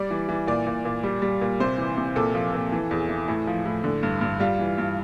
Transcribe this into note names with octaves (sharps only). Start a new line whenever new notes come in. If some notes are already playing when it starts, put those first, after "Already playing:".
Already playing: G3 D5
E3
E3
A#2 D5
A#2
A#2
G3
G3
A#2
C3 C5
E3
C3
A#2 A4
F3
A#2
E3
E2
E3
A2
F3
A2
D3
G2
G2
G3 F4
E3
G2